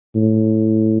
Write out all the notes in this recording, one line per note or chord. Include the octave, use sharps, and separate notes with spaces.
A2